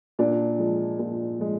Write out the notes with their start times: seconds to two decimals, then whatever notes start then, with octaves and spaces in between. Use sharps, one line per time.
0.19 A#2 D4
0.58 F3 G#3
0.99 A#2
1.39 F3 G#3